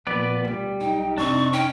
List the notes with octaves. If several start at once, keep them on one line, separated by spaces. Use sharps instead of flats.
A#2 F3 B3 B4 D5
D2 B2 G3
B1 D#4 G5
F2 C3 C4 D4 C#6
C#4 G5